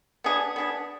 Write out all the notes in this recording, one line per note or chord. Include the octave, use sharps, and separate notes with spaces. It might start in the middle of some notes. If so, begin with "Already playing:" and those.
B3 D4 G#4
B3 D4 G#4